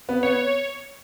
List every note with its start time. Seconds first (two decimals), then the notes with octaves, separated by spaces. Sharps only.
0.09 B3
0.23 B3 C#5